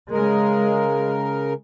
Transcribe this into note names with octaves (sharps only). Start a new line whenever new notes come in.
C#3 G#3 A#4